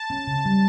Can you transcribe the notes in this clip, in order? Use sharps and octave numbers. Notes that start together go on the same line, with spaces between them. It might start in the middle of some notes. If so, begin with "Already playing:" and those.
Already playing: A5
C#4
C#3
G3